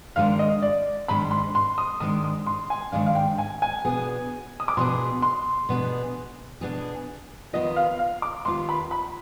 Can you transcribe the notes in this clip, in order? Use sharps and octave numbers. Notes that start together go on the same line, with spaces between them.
G#2 D#3 G#3 D4 F5
D#5
D5
G#2 D#3 G#3 D4 B5
C6
C6
D#6
G#2 D#3 G#3 D4 D#6
D#6
C6
G#5
G#2 D#3 G#3 D4 F5
F5
G5
G#5
G#5
B2 B3 D4 G#4
D#6
D6
B2 B3 D4 G#4 C6
C6
B2 B3 D4 G#4
B2 B3 D4 G#4
D#2 D#3 B3 F4 D#5
F5
F5
D6
D#2 D#3 B3 F4 C6
B5
B5